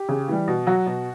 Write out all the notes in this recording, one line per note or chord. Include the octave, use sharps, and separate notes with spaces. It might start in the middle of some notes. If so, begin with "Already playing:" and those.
Already playing: G4
C#3
E3 G3
B2
F#3 F#4
B2